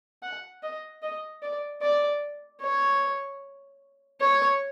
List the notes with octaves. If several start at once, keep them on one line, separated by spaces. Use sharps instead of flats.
F#5
D#5
D#5
D5
D5
C#5
C#5